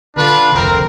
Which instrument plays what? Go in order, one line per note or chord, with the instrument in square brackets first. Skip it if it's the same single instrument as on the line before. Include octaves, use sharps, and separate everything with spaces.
[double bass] D3 [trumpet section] D4 F4 B4
[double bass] F1 D2 [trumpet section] C4 A#4